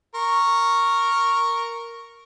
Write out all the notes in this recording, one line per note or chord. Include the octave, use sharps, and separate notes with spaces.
A#4 C#6